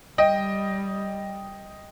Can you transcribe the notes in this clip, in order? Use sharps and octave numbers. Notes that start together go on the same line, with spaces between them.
G3 D#5 G5